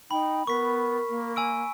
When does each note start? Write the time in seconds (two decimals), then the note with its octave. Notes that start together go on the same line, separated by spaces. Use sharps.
0.11 D#4 G5 B5
0.47 B3 A#4 C#6 B6
1.09 A#3
1.36 G#5 E6 D7